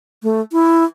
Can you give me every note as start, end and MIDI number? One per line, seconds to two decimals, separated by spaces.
0.23 0.41 57
0.52 0.84 64